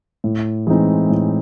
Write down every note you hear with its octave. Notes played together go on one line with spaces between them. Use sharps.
A2
E3 G#3 C4 D#4
A2